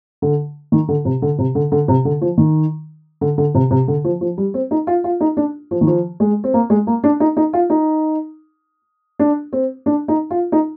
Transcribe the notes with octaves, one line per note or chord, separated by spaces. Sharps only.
D3
D#3
D3
C3
D3
C3
D3
D3
C3
D3
F3
D#3
D3
D3
C3
C3
D3
F3
F3
G3
C4
D#4
F4
F4
D#4
D4
F3
D#3
F3
G#3
C4
A#3
G#3
A#3
D4
D#4
D#4
F4
D#4
D4
C4
D4
D#4
F4
D#4